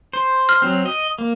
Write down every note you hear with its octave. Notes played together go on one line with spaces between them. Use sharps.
C5
F6
F#3 C4
D#5
A#3